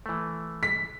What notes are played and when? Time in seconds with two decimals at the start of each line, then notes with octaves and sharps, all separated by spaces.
0.06 E3 A3
0.63 B6